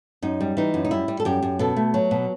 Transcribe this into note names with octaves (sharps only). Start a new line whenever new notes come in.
F#2 D#4
G3
E3 D#4
F#2
D#4
G3 E4
G3
A4
F#2 G4
F#2
B2 A4
A3
F#3
B2